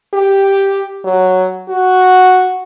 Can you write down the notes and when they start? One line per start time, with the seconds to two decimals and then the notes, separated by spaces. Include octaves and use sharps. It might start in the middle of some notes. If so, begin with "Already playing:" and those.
0.14 G4
1.04 F#3
1.69 F#4